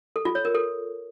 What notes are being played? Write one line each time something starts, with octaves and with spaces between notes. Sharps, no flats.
A4
F4
C#5
A#4
A4